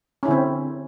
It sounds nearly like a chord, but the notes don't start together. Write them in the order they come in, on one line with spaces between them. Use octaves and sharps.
C#4 E4 D3 C4